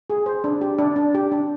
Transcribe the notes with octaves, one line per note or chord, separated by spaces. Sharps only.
G#4
C5
D4
G4
D4
D4
G4
D4